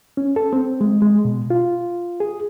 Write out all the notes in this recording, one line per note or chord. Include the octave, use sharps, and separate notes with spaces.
C#4
A4
C4
G#3
G#3
B2
F4
G#4